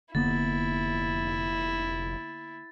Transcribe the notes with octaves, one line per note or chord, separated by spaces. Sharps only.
F1 D3 A#3 B3 E4 A6